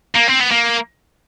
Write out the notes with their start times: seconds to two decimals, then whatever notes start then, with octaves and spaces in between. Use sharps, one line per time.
0.16 A#3
0.29 C4
0.41 B3
0.51 A#3